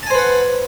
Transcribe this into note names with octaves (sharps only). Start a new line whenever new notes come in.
B4 C5 F#5 G#5 A5